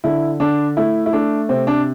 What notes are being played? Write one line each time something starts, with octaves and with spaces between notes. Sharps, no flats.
D3 E4
D3 D4
A3 E4
E4
A3 D4
C3 C4
D4